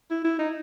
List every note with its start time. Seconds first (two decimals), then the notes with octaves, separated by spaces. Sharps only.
0.11 E4
0.24 E4
0.39 D#4